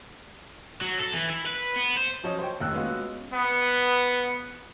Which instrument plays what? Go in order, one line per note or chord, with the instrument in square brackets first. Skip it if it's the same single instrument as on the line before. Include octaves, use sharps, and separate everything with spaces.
[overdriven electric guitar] F#3
A4
E3
E4
B4
B3
C5
[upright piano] F3 F#3 C#4 C#5 D#5
C5 C#5 G5
F1 D#2 E6 F#6
G#3 B3 C#4 F4 F#4
[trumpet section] B3